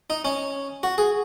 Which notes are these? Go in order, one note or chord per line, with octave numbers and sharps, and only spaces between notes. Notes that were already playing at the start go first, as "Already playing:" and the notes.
D#4
C#4
F#4
G#4